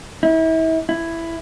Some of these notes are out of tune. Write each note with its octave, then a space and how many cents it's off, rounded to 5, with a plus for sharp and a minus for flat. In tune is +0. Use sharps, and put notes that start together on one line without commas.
E4 -35
E4 +10